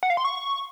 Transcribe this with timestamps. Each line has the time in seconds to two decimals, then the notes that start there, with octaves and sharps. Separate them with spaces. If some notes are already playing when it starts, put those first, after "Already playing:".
0.03 F#5
0.10 F5
0.17 C6
0.25 C#6